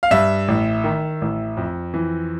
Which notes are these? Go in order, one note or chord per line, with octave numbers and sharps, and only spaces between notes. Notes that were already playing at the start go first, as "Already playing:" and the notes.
F5
G2 E5
A1
D#3
A1
F2
E3